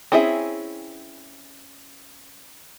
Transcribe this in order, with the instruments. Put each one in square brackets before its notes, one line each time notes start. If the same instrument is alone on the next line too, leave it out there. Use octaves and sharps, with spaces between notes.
[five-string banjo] C4 C#4 E4 G#4 E5